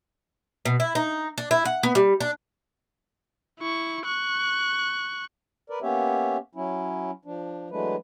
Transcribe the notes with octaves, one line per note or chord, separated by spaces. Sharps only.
B2
E4
D#4
D4
E4
F#5
B3
G3
D4
E4 C#6
C#6 F#6
A#4 B4 D5
A#3 B3 C#4 G4 C#5 E5
F#3 C#4 E4
F3 D4
E3 F#3 G#3 A3 D4 B4